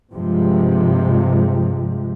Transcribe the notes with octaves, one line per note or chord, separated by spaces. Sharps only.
G2 C3 F3 G#3